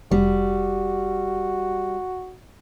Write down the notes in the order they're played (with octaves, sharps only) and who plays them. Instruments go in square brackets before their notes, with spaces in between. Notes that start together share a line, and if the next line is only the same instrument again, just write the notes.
[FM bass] F1 [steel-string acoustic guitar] G3 [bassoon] F#4